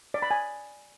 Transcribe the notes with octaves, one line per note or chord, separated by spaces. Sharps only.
D5
B5
G#5